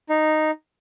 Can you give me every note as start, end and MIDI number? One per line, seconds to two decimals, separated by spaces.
0.09 0.51 63